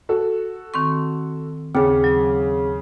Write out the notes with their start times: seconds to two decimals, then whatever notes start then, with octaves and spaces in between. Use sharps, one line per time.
0.09 F#4 A4
0.74 D#3 C4 C#6
1.75 D#2 C#3 C4 G#4
2.04 F#3